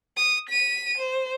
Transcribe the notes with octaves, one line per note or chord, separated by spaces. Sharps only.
D#6
B6 D#7
C5